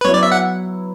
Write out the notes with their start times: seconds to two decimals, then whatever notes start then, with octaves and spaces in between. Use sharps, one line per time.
0.01 B4
0.05 F#3 B3 E4 C#5
0.14 D5
0.23 E5
0.32 F#5